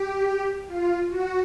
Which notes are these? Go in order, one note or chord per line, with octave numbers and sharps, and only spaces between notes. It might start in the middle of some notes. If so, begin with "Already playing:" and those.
Already playing: G4
F4
F#4